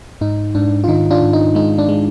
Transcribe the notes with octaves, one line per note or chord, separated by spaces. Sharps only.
G#2 D#4
G#2 D4
F4
D#3 D#4
D4 F4
G#2
D#4
G#3 D#4
D4
G#3